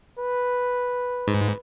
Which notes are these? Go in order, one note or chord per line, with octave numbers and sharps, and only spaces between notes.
B4
G#2